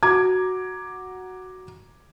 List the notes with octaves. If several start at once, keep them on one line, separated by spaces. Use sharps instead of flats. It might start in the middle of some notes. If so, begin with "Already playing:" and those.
F#4 A#5 D6 G#6